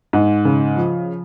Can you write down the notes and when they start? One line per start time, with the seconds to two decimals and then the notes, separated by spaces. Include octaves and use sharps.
0.13 G#2
0.45 C#3
0.76 F3